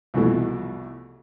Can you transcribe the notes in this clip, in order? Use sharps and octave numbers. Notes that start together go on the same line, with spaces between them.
C2 F2 B2 E3 A3